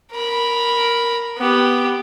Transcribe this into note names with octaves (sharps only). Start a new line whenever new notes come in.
A#4 B5
B3 G4